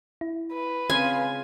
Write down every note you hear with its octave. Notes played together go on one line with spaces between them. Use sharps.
E4
B4
C#3 G#3 C4 F4 G#5